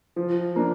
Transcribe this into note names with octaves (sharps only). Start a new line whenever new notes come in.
F3
A#3 D4